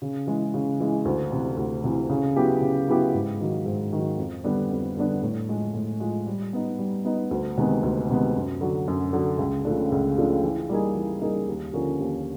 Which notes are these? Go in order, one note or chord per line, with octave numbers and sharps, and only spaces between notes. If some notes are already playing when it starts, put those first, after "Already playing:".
C#3
E3 G#3
C#3
E3 G#3
D2
C3 E3
D2
C3 E3
C#3
F#3 B3 E4 G4
C#3
F#3 B3 E4 G4
G#2
D#3 F#3
G#2
D#3 F#3
F2
D3 G3 B3 D4
F2
D3 G3 B3 D4
A2
F3 G#3
A2
F3 G#3
G3
B3 D#4
G3
B3 D#4
D2
C3 D#3 G#3 B3
D2
C3 D#3 G#3 B3
F#2
D3 F#3
F#2
D3 F#3
C#2
C#3 F3 A3 D4
C#2
C#3 F3 A3 D4
E3
G3 A#3 D#4 G#4
E3
G3 A#3 D#4 G#4
D#2
D3 F3 A#3 C#4
D#2